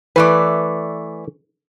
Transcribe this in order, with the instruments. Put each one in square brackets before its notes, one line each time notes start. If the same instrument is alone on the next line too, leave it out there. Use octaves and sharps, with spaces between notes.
[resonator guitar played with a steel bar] E3 A3 D5 [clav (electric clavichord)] B4